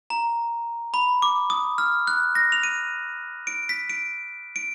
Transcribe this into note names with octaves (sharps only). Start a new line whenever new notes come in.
A#5
B5
D6
D#6
F6
F#6
A#6
F7
D#7
D7
B6
D7
D7